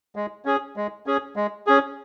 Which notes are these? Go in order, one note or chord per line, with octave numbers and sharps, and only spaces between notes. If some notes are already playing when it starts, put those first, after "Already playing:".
G#3
C#4 G#4
G#3
C#4 G#4
G#3
C#4 G#4